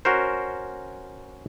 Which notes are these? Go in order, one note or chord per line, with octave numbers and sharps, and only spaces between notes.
C#4 F#4 A#4 C5